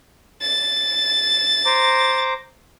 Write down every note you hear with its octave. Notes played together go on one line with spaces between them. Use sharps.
A6
C5 A#5 D6